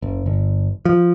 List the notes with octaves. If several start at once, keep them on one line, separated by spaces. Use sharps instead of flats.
F#1
G1
F3